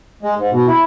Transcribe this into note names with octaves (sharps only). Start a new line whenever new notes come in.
G#3
G#2
B2
E4